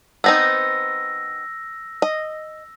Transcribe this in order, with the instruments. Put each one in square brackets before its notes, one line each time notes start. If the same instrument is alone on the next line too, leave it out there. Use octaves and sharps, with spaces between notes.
[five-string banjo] B3 C4 D#4 [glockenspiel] E6 A#6
[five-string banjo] D#5